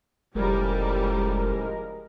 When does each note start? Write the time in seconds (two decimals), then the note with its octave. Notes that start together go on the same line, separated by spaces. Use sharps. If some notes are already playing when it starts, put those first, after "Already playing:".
0.35 F1 A2 C#3 F3 G3 G#3 A#4